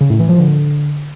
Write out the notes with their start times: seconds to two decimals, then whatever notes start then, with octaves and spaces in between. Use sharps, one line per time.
0.01 C#3
0.10 A2
0.19 E3
0.29 F3
0.38 D3